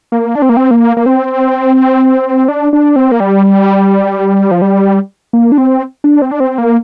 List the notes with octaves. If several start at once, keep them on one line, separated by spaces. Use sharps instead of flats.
A#3
D4
C4
A#3
C4
A#3
A#3
C4
D4
D4
C4
A#3
G3
F3
G3
A#3
D4
C4
D4
C4
D4
C4
A#3